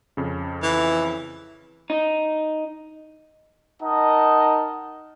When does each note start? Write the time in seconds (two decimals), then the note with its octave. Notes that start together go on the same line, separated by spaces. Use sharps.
0.17 F2 C#3
0.62 E3
1.90 D#4
3.83 D#4 A#4 D#5 F#5 A5